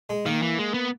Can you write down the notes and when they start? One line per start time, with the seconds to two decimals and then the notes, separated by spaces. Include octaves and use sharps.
0.10 G#3
0.26 D#3 A#3
0.42 E3
0.59 G#3
0.74 B3